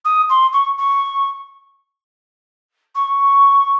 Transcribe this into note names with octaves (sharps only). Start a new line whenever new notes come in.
D#6
C6
C#6
C#6
C#6